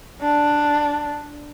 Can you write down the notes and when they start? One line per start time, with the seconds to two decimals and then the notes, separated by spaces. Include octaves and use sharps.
0.22 D4